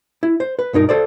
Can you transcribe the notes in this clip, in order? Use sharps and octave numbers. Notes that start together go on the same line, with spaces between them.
E4
C5
B4
B1 G2 D#4 A#4
A4 C5 D5